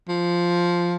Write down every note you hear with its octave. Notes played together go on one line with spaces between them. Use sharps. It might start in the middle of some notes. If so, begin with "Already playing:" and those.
F3